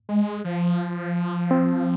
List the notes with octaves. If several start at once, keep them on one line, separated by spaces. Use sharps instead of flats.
G#3
F3
C4